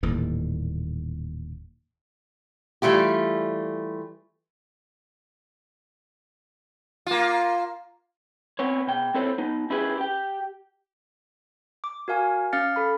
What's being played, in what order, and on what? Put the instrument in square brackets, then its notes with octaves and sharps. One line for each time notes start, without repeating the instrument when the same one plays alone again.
[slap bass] D#1 D#2 A2 E3
[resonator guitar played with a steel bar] E3 G3 A3 F4 G4
[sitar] A#3 F4
[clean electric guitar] B3 C4 C#5
B2 G5
C4 E4 A4 C5 C#5
B3 D#4
C#4 E4 G4 G#4 B4
G4 G5
[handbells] D6
F#4 A#4 F5 G#5
C#4 F5 F6 A6 C#7
A4 B5